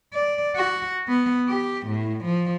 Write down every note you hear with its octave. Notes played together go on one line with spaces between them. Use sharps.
D5
F#4
B3
G4
A2
F3